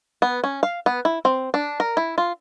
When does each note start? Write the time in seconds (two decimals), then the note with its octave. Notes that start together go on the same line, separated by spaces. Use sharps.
0.22 B3
0.44 C#4
0.63 F5
0.86 B3
1.05 E4
1.25 C4
1.54 D4
1.80 A#4
1.97 E4
2.18 F4